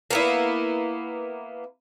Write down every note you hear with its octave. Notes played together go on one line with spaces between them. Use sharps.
A#3 B3 E4